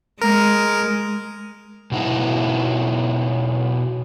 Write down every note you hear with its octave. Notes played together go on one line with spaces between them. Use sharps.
G#3 A#4
B2 D#4 E4